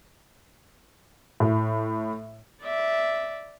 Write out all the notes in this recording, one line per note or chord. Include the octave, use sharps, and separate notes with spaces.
A2
D5 E5